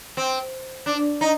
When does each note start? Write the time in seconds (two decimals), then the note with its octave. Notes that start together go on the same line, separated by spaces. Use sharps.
0.17 C4
0.86 D4
1.21 D#4